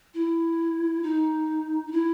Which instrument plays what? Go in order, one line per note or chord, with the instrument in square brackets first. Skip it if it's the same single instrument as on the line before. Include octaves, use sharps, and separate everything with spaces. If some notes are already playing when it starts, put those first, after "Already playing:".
[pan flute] E4
D#4
D#4
E4